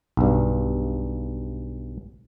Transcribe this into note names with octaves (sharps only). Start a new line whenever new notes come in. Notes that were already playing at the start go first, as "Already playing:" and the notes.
B1 G2